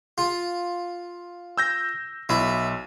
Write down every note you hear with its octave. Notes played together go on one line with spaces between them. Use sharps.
F4
E6 G6 A#6
B1 E4